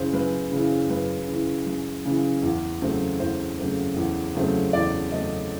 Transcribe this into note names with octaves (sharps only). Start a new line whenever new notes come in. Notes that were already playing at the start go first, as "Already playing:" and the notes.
Already playing: F#2 C#3 E3 C5
F#2 B4
C#3 E3
F#2 B4
C#3 E3
F#2
C#3 E3
E2
C#3 F#3 A3 C4
E2 C5
C#3 F#3 A3 C4
E2
C#3 F#3 A3 C4
E2 D5
C#3 F#3 A3 C4 D#5